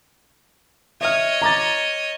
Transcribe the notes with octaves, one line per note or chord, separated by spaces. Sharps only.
C#5 D#5 E5 F6
A#5 D6 A6